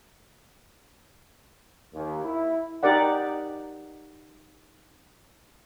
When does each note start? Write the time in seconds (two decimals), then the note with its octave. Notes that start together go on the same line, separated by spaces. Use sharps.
1.94 D#2
2.24 E4
2.83 D#4 G4 A#4 D5 F#5